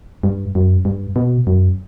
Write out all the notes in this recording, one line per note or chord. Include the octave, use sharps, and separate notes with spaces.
G2
F#2
G2
B2
F#2